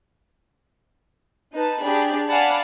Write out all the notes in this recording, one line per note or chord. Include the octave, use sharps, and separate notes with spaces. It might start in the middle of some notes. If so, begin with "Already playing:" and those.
D#4 B4 A5
D4 G4 G#4 D5 B5
D5 F5 F#5 G#5 A5 B5